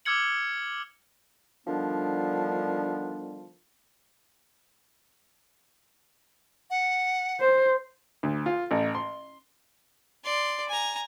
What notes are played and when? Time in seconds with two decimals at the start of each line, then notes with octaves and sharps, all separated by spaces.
0.05 D6 E6 F6 G#6 C#7 F#7
1.67 D3 D#3 F3 G3 B3 D4
6.70 F#5
7.40 C5
8.23 D2
8.46 F4
8.71 A1
8.95 C6
10.24 D5 C6
10.69 G#5 A#5